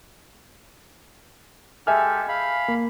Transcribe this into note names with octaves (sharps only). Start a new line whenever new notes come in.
G#3 G4 A4 E5 G#5 F6
F5 B5
A#3